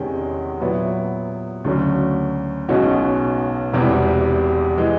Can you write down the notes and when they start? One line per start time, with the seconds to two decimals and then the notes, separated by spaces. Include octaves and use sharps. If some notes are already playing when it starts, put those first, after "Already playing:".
Already playing: E2 C3 D#3 G#3 C#4
0.61 A#2 F#3 B3 E4
1.64 D2 C#3 F#3
2.69 B1 B2 G#3 C#4 F#4
3.73 E1 E2 C3 E3 G3
4.78 E3 G#3